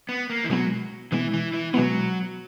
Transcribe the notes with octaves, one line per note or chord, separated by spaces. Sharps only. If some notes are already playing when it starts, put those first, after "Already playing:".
B3
A#3
E3
B2 F#3 G#3 B3
B2 E3 G#3 B3
E3
E3
B2 F#3 G#3 B3